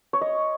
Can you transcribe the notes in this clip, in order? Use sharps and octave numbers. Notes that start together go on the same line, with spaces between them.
C#5
D#5